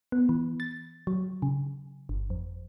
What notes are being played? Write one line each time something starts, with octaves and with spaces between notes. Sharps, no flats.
B3
E3
A6
F#3
C#3
G1
F2